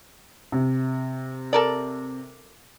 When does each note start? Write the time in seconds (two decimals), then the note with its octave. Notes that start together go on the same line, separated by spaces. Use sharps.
0.52 C3
1.53 A4 A#4 D5